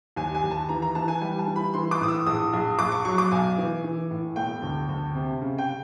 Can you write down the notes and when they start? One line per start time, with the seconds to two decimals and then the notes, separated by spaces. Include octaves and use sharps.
0.16 D#2 G#5
0.35 G#5
0.43 D#2
0.51 A5
0.69 E3 A#5
0.82 A#5
0.95 E3 A5
1.08 G#5
1.21 G3 G#5
1.39 A5
1.47 E3
1.56 B5
1.74 E3 C6
1.91 D6
2.01 A2 D#6
2.08 E6
2.26 A#1 D#6
2.53 A#1
2.78 A#1 D6
2.92 C#6
3.05 F#3 C#6
3.18 D6
3.32 B1 G#5
3.58 E3
3.84 E3
4.10 A2
4.36 E1 G5
4.62 D2
4.89 D2
5.15 C3
5.41 C#3
5.58 G5